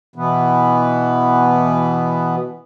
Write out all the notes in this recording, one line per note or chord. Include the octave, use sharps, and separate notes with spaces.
B2 E3 B3